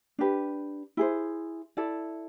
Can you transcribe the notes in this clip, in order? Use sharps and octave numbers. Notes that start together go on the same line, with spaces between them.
D4 G4 B4
E4 G#4 C5
E4 A4 D5